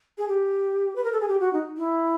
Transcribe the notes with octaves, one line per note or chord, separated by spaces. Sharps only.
G#4
G4
B4
A#4
A4
G#4
G4
F#4
D#4
E4